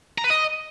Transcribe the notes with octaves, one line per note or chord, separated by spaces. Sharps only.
A#5
B4
D#5